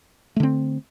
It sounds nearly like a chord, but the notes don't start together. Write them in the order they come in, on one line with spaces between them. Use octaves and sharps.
A3 D3 C4